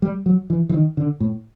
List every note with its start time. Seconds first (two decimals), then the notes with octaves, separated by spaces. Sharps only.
0.02 G3
0.26 F#3
0.50 E3
0.69 E3
0.74 D#3
0.97 D3
1.20 A2